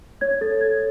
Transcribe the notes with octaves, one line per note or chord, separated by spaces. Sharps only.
C#5 G#6
A4 A6
C#5 G#6